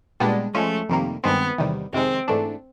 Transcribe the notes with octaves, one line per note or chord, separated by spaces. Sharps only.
A#2 G3 G#3 B3 D4
F3 G#3 A3 C#4
F2 C3 D#3 G3 A#3
G2 D#3 G#3 B3 C4
E2 C3 D#3 G3
F2 C3 D#3 G#3 C4
G#2 E3 A3 D4